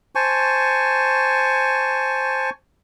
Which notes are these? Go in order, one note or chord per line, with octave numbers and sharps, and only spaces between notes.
C5 G#5 A5 C#6